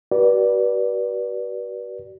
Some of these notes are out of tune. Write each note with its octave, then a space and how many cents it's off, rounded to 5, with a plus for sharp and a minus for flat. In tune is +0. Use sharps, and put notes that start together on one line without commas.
F#4 +45 B4 -30 D5 +0